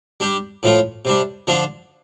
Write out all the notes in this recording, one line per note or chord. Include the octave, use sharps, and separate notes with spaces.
G3 D4 G4
A2 F3 A3 F4
C3 G3 D4
D3 F3 D4 F4